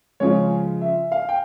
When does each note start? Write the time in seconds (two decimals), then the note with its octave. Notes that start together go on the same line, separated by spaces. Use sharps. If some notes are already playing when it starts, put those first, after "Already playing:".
0.20 C#3 F3 G#3 C#5
0.81 E5
1.12 F5
1.29 G5